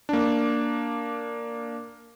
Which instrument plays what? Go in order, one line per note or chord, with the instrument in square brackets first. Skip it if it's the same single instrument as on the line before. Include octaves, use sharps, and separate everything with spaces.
[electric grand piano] A#3 D4